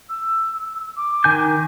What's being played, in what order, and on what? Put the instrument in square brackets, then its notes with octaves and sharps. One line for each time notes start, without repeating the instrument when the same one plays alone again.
[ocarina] E6
D6
[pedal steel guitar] D#3 G#5 G6